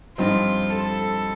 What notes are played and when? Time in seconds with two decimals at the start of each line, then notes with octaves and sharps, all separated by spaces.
0.18 G2 F3 C4 D#4 F4
0.70 A4